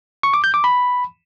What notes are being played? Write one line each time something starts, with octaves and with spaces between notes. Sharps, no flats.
C#6
D6
G6
D6
B5